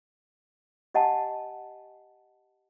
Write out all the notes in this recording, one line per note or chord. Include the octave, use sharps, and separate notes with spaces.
G4 D#5 F#5 G#5 A5